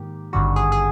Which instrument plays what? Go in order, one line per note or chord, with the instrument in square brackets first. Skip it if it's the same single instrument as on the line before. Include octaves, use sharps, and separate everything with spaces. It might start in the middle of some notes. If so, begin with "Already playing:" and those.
Already playing: [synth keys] G#2 D#3 A#3 G4
G#1 G2 D3 G3 F#4
G#4
G#4